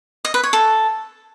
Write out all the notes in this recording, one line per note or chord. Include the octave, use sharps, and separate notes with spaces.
D#5
B4
C#5
A4